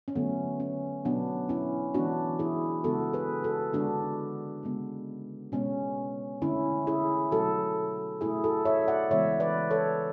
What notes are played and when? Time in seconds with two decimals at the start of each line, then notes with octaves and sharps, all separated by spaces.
0.08 C#4
0.16 D3 F#3 A3 B3
0.60 C#4
1.05 B2 F#3 B3 D4
1.49 C#4 E4
1.94 E3 G#3 B3 D4 F#4
2.39 E4 G#4
2.84 C#3 G#3 B3 F#4 A4
3.13 G#4 B4
3.44 F#4 A4
3.73 D3 G#3 B3 D4 F#4
4.63 C#3 G#3 B3
5.52 B2 G#3 B3 C#4
6.42 D3 A3 C#4 E4
6.87 E4 G#4
7.32 B2 F#3 A3 F#4 A4
8.21 B2 E4 G#4
8.25 A3
8.44 F#4 A4
8.65 C#5 E5
8.88 D5 F#5
9.10 C#3 E3 G#3 B3 C#5 E5
9.40 B4 D5
9.71 A4 C#5